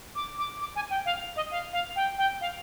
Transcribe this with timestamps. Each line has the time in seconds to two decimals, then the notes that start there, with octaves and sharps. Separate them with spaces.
0.15 D6
0.38 D6
0.60 D6
0.75 G#5
0.90 G5
1.05 F5
1.36 D#5
1.51 F5
1.73 F5
1.95 G5
2.18 G5
2.40 F5